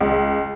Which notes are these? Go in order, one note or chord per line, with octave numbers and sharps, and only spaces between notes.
C#2